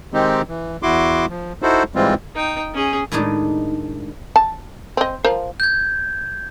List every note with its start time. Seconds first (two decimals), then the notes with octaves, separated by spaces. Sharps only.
0.14 D#3 G#3 C4 D#4 G4
0.48 E3
0.83 E2 E4 F#4 C6 D6
1.30 F3
1.62 D#4 E4 F#4 A4 C5
1.96 G#2 E3 G3 G#3 C4 F4
2.35 D#4 G5
2.74 C#4 G#4
3.12 A2 D#3 G#3 D4 D#4
4.36 A5
4.97 C4 D#5
5.24 F3 A#4 C5
5.60 G6 G#6